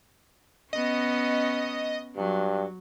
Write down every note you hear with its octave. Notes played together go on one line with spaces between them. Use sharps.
B3 C#4 D#5
G2 F#3